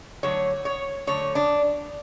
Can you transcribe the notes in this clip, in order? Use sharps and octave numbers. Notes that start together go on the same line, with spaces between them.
D3 F#3 A3 C#5
C#5
D3 F#3 A3 C#5
D4